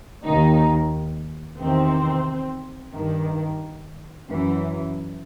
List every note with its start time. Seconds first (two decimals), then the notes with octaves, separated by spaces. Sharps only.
0.24 D#2 D#3 D#4
1.59 E2 C3 D#3 C4
2.93 G2 D#3
4.29 F#2 E3